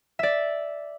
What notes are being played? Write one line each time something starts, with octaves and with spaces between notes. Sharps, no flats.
D5 E5